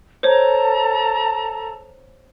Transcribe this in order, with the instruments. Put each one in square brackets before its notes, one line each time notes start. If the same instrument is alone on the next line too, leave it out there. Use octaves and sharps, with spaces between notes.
[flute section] A4 A5 A#5 [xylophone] C5 C#5